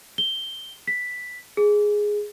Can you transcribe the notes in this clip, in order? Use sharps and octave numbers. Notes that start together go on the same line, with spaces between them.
G7
B6
G#4